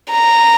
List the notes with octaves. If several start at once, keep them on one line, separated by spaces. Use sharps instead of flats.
A#5